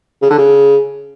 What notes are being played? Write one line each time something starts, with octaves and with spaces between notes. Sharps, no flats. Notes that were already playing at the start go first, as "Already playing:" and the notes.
C#3
D3
C#3